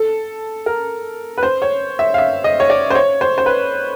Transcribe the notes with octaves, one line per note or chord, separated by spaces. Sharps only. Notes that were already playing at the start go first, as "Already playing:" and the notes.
Already playing: A4
A#4
B4
C5
C#5
E5
F5
E5
D#5
C#5
D5
C5
C#5
C5
C5
B4